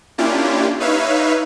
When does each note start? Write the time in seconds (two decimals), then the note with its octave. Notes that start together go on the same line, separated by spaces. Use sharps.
0.18 A#3 C#4 D4 E4 F4 G4
0.80 D#4 B4 C#5 E5 F5